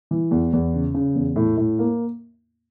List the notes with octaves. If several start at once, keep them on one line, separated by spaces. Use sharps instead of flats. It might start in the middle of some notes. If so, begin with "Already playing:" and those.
E3
E2
E2
C#3
C#3
E2
A2
A2
A#3